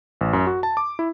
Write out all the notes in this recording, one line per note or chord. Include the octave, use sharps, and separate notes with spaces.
A1
F#2
F#4
A5
D6
E4